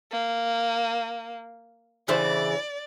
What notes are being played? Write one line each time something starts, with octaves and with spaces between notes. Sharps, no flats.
A#3
C#3 E3 C5 D5